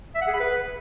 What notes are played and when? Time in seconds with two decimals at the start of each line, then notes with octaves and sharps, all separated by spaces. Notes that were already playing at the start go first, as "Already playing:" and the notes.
0.15 E5
0.21 F#5
0.28 G#4
0.34 B5
0.40 B4